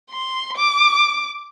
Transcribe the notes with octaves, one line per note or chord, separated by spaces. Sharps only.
C6
D6